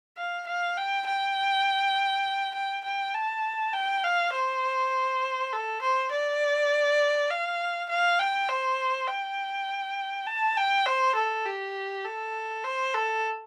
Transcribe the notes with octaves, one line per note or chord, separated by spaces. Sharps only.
F5
F5
G5
G5
G5
G5
A5
G5
F5
C5
A4
C5
D5
F5
F5
G5
C5
G5
A5
G5
C5
A4
G4
A4
C5
A4